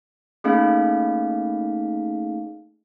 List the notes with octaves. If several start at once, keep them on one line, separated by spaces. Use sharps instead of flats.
A3 A#3 C#4 D#4 G#4 F5